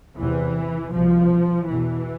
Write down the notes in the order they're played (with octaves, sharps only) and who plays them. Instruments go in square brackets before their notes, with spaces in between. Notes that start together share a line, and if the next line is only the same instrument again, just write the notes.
[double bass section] E2 C3 E3
C2 B2 F3
E2 B2 E3